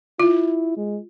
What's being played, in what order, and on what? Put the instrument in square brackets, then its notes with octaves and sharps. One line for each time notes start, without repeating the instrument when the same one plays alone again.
[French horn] E4 [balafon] F4
[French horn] G#3